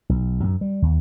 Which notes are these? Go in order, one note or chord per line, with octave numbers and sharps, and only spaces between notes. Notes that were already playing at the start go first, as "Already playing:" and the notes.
B1
F#2
G3
D#2